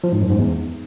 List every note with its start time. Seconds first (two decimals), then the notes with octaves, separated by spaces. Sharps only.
0.04 F3
0.12 G#2
0.21 F#2
0.30 G#2
0.38 E2